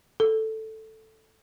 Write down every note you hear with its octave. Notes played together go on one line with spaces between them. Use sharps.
A4